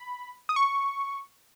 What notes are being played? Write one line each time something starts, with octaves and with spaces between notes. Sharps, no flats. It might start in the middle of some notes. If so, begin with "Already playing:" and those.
Already playing: B5
D#6
C#6